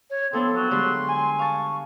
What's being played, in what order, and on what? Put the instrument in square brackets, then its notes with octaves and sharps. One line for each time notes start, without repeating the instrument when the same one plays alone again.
[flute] C#5
[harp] F3 B3 D4 [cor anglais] C4 [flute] A4
[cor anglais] F#3
[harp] D3 G3 G#3 [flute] C6
[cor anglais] G#5
[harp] F5 A5 [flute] C#6